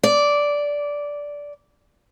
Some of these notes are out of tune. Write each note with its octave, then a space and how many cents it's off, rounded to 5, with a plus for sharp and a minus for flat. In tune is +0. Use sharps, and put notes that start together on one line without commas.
D5 -10